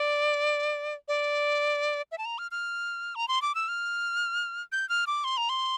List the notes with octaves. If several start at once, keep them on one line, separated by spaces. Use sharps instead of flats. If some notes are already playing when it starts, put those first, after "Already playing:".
Already playing: D5
D5
E5
A5
A#5
F6
F6
A#5
C6
D6
E6
F6
G6
F6
D6
C6
A#5
C6